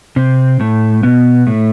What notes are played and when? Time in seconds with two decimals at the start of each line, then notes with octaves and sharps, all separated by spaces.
0.16 C3 C4
0.60 A2 A3
1.03 B2 B3
1.47 A2 A3